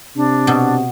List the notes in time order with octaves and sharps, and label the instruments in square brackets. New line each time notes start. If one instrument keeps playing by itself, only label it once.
[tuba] C3 [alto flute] D4
[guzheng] B2